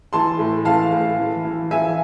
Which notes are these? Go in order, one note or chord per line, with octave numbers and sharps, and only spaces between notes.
E3 A5 C6
A2
E3 F5 A5
A2
E3
E3
E3 E5 G#5